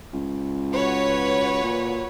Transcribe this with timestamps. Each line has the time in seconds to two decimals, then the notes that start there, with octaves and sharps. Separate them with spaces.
0.13 C#2
0.72 F#4 B4 C#5
1.63 A#2